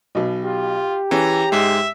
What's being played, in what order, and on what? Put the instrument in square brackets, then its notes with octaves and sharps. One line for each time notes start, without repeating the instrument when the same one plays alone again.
[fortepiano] B1 B2
[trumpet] F4 [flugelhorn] G4
[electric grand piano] E3 [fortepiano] C#4 G#4 [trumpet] A#5
[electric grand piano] G#2 G#3 [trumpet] E5